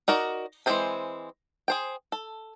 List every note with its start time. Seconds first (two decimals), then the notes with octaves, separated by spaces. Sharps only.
0.08 D#4 F#4 A#4 D5
0.66 E3 G#3 C4 C5 B5
1.68 G#4 C5 G5
2.12 A4